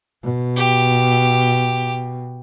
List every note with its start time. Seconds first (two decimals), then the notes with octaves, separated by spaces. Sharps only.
0.23 B2
0.56 G4